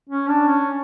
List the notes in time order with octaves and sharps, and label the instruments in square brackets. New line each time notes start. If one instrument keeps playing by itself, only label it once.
[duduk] C#4
D4
C#4